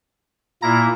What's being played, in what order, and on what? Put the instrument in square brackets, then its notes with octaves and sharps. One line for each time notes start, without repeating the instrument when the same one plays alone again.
[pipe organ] A#2 A#3 E4 [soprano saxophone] A#5